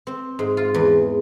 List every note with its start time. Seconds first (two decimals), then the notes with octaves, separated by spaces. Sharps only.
0.07 C4
0.39 G#2
0.57 F4
0.74 E2